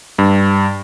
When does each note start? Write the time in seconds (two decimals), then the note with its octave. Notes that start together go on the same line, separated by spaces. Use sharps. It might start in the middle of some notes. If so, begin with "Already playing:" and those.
0.19 G2